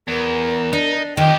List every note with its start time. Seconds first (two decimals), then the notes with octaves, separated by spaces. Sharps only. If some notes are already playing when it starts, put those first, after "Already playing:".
0.08 E2 A#4
0.73 D4 D#4
1.17 F2 D#3 G4 D#5 G5